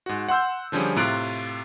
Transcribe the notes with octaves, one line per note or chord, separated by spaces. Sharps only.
G#2 F#4
F#5 C6 E6 G6
D3 F3 G3 C#4 G#4
A2 C3 F4 A#5 F#6 D7